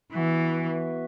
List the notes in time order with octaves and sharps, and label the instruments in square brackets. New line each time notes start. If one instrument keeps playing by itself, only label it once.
[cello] E3 [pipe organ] B3 F#4 B4 E5